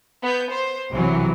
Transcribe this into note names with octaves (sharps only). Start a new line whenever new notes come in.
B3 G6
C5
B1 C3 E3 F#3